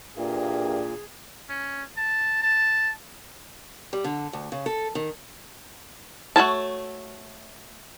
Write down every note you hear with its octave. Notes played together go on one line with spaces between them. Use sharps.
A#2 E3 A#3 D4 G4 G#4
C#4
A5
A5
G3
D3
D2
C#3
A4
D#3
A3 F#4 C#5 A5